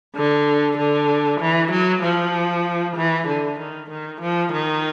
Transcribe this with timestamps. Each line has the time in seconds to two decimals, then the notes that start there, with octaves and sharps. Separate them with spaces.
0.15 D3
0.78 D3
1.40 E3
1.71 F#3
2.03 F3
2.96 E3
3.27 D3
3.59 D#3
3.90 D#3
4.21 F3
4.52 D#3